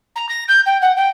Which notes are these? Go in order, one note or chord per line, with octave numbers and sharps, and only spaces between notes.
A#5
A#6
G6
G5
F#5
G5